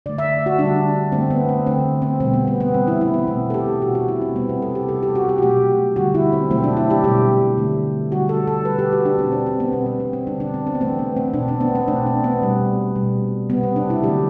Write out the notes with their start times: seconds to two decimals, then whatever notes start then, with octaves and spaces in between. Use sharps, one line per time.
0.06 D3 A3 D5
0.18 E5
0.46 F#4
0.59 D3 G3 D4
1.12 D3 A3 C4
1.30 B3
1.49 C4
1.67 D3 A3 C4
2.02 C4
2.20 B2 G3 C4
2.34 B3
2.47 B3
2.60 B3
2.74 C3 E3 G3 C4
2.87 E4
3.01 E4
3.14 B3
3.28 B2 A3 C4
3.50 A4
3.54 G4
3.82 B2 G3 F#4
3.95 F#4
4.08 E4
4.22 C4
4.35 C3 G3 B3
4.49 C4
4.62 A4
4.75 G4
4.89 C3 G3 A4
5.03 G4
5.15 F#4
5.29 G4
5.38 F#4
5.42 B2 F#3 A3 G4
5.96 D3 G3 F#4
6.15 E4
6.32 C4
6.50 B2 F#3 A3 C4
6.64 D4
6.77 E4
6.90 G4
7.04 B2 G3 G4
7.58 D3 A3
8.11 D3 G3 F#4
8.29 A4
8.47 A4
8.65 B2 G3 B4
8.79 G4
8.93 F#4
9.05 D4
9.19 B2 G3 C4
9.32 C4
9.46 C4
9.60 B3
9.72 B2 G3 C4
9.86 B3
10.00 C4
10.13 C4
10.27 D3 G3 D4
10.40 D4
10.54 C4
10.67 C4
10.75 B3
10.80 C3 E3 A3 C4
10.99 B3
11.17 C4
11.34 B2 A3 D4
11.48 C4
11.61 B3
11.75 C4
11.88 B2 A3 D4
12.06 C4
12.24 B3
12.42 B2 G3
12.95 B2 G3
13.49 C3 G3 B3
13.63 C4
13.76 D4
13.90 E4
14.03 D3 F#3 A3 G4